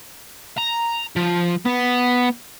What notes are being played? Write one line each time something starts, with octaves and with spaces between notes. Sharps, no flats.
A#5
F3
B3